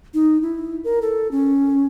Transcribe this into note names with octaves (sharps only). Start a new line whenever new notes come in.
D#4
E4
A#4
A4
C#4